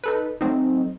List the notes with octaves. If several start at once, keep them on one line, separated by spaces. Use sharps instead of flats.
D#4 A4 B4
F#3 A3 C4 D#4